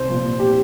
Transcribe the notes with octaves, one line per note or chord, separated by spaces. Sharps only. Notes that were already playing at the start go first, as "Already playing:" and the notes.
Already playing: C2 C5
A#2 F3
G4